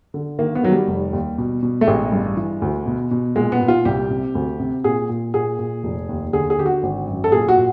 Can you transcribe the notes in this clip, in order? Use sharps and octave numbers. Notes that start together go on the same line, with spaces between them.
D3
D#3 A#3
B3
D#3 F#3
G3
F1
D#2
B2
B2
A3
A1 G#3
G2
E3
D2
B2
B2
A#2 G#3
B3
A#2
F4
C2 G4
C3
D2
C3
A#2 G#4
A#2
A#2 G#4
A#2
F1
D#2
D3 G#4
G#4
D3 G4
F#4
G#1
F#2
A4
A#2 G#4
F#4
A#2